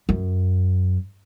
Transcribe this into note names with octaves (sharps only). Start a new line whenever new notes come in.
F#2